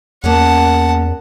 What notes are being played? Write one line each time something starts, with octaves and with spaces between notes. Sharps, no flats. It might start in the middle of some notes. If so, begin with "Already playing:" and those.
E2 A#3 B3 C#4 F#5 A5